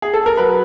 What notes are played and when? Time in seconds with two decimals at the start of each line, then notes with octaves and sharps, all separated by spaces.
0.02 G#4
0.14 A4
0.26 A#4
0.37 F#3 B4